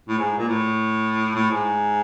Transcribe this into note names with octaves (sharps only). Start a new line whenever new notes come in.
A2
G#2
A#2
A2
A2
G#2